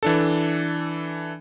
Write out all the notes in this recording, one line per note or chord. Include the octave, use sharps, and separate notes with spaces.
E3 D4 A4